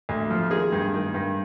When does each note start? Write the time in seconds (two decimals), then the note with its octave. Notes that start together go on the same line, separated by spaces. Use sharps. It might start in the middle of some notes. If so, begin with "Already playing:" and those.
0.09 D2
0.30 F3
0.51 D#3 G#4
0.72 G2
0.94 D#3
1.14 G2